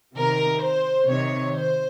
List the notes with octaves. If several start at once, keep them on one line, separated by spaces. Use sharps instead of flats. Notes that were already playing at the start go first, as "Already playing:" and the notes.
C3 D#3 A#4
C5
C3 D#3 C#5
C5